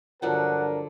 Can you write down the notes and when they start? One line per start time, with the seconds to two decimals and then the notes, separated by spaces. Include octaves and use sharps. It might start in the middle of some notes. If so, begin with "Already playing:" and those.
0.22 G2 D3 F3 F#3 D4 A#4 F#5